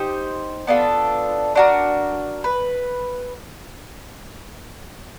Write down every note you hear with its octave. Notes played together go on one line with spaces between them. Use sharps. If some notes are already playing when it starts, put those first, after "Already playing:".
Already playing: D#4 G4 C5
B3 D4 F4 A4
D4 F#4 A#4
B4